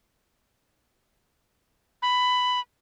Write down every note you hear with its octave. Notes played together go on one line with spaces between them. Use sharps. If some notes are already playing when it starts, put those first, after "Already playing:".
B5